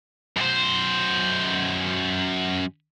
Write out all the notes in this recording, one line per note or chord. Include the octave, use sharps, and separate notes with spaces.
F#2 C5